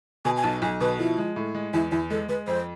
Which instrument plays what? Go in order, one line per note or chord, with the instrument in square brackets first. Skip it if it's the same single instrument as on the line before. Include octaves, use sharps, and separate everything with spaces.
[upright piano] B2 [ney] G#5
[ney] G#5
[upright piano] B1 [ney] A5
[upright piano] B1 [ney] G#5
[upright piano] B2 [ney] B4
[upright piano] F3 [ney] E4
[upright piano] G#3
A2
G#3
[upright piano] E2 [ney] E4
[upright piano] E2 [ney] E4
[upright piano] G#3 [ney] A4
[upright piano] G#3 [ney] B4
[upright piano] F2 [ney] C5